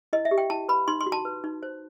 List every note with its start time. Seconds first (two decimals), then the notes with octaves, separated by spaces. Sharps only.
0.13 E4 D#5
0.25 E5
0.31 G4
0.38 G5
0.50 E4 A5
0.68 B4 B5
0.88 D#4 C6
1.01 C6
1.06 F#4
1.12 A5
1.25 B4
1.44 D#4
1.63 C5